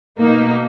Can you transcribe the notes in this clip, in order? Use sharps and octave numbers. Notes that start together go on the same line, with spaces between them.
B2 A#3 D#4